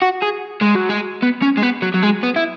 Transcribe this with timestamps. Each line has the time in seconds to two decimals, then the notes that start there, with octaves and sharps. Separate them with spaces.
0.02 F#4
0.23 G#4
0.62 G#3
0.76 F#3
0.90 G#3
1.23 B3
1.42 C#4
1.58 G#3
1.63 B3
1.82 F#3
1.94 F#3
2.02 G#3
2.23 B3
2.36 E4